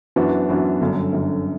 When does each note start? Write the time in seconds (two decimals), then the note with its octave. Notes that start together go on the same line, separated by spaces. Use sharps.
0.16 F#2 E3 B3 D4 F#4
0.49 F#2 E3 B3 D4 F#4
0.81 G1 F#2 D3
1.12 G1 F#2 D3